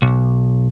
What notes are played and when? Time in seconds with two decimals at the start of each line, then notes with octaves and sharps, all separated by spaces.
0.02 B1